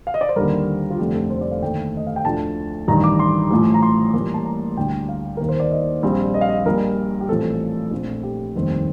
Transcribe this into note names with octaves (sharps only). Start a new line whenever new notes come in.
F5
D#5
D5
C5
D#2 D3 G3 A#4
F4
F1 F2 D3 A3 C4 G4
A4
C5
D5
F5
D#2 D3 A3 G5
D#5
F5
G5
D2 D3 F3 A3 A5
A1 G2 D#3 A#5
D6
C6
A1 A2 F3
A#5
C6
A1 A2 G3 A#3
A5
A#5
D2 D3 G3 G5
F5
D#2 D#3 A#3 A#4
C5
D5
D#5
A#1 A#2 G3 C4
D#5
F5
D#5
A#1 A#2 G3 A#4
G4
A1 A2 F3 C4 A4
A#1 A#2 A3 C4
G4
F1 D#2 D#3 G3 C4